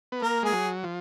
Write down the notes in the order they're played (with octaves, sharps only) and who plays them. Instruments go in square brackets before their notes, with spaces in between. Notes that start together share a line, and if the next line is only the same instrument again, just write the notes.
[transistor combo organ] B3
[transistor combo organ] A#3 [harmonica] A#4
[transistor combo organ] G#3 [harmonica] G#4
[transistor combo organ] F#3
F3